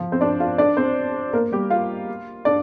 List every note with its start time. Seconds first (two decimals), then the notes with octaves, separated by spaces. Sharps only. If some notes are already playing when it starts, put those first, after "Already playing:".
Already playing: F3 F4
0.12 C4 C5
0.21 D4 D5
0.40 F4 F5
0.58 D4 D5
0.77 C4 C5
1.33 A#3 A#4
1.52 G3 G4
1.70 F4 F5
2.45 D4 D5